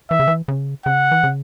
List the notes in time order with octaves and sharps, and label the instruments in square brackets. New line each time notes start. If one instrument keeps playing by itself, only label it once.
[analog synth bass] E3 [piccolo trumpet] E5
[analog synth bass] C#3
E3
C#3
[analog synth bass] C#3 [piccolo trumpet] F#5
[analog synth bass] E3
C#3